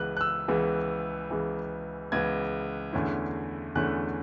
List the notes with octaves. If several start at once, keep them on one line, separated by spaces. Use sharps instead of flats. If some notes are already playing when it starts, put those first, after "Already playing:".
Already playing: C#2 C#3 E3 B3 F#6
F#6
E6
C#2 C#3 E3 B3
C#2 C#3 E3 B3
C#2 C#3 E3 B3 G#6
E2 D3 A3 C#4 E4
E2 D3 A3 C#4 E4 F#6